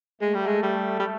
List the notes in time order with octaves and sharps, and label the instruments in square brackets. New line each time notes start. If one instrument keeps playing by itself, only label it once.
[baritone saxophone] G#3 [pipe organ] A3
[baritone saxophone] G3
G#3
G3
G3